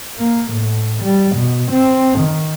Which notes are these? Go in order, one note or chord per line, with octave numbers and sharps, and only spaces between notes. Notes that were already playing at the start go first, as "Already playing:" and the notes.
A#3
A2
G3
B2
C4
D#3